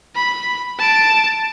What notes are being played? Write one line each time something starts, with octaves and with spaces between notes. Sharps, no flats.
B5
A5 D7